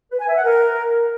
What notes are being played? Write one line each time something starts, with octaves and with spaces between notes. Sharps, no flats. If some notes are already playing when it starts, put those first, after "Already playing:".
B4
G#5
E5
F#5
A#4